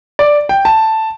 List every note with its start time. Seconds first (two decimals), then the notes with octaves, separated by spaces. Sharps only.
0.19 D5
0.49 G5
0.65 A5